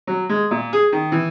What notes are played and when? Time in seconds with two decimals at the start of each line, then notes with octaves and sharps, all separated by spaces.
0.07 F#3
0.29 G#3
0.51 A#2
0.73 G#4
0.93 D#3
1.12 E3